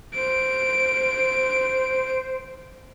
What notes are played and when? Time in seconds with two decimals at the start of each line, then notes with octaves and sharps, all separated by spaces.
0.15 C5 D7